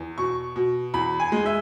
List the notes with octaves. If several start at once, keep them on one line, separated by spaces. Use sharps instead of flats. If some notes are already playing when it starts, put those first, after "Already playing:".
Already playing: E2
B2 C#6
B2
E2 B5
G#5
G#3
E5